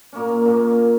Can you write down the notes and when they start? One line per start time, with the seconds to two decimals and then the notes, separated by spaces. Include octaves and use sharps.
0.13 A#2 A#3 C#4
0.45 A#2 A#3 C#4